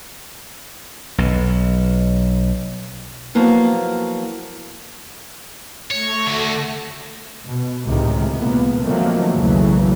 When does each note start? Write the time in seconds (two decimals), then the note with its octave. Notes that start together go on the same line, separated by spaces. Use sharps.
1.18 B1
3.35 F3 F#3 A#3 B3 E4
5.91 A3 C#5 A#6
6.26 D3 F#4
7.45 B2
7.86 C#2 A2 C3 D#3 G#3
8.38 C#2 A#2 A#3 B3
8.82 D#3 F3 F#3 A3 A#3 C4
9.33 B1 E2 C#3 E3 F#3 A3